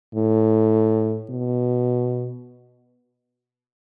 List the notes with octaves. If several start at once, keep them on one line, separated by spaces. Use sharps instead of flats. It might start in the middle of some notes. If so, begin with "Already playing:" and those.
A2
B2